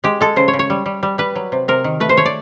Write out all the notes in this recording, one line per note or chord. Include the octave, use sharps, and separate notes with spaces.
G#3 G4
G#3 A4
C#3 C5
C#5
C#3
C#5
G3
G3
G3
G3 B4
F#3
C3
C3 A#4
D#3
A3 B4
C5
A3 C#5
D5